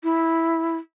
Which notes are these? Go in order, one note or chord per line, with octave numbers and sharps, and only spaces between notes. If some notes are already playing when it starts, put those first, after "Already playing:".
E4